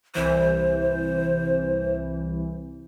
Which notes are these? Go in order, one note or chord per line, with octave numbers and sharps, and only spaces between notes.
C2 E3 C5